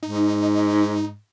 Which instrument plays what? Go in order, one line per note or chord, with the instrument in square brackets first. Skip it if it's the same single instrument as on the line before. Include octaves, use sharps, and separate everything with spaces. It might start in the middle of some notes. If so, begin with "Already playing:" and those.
[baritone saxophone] G#2 [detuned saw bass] D#4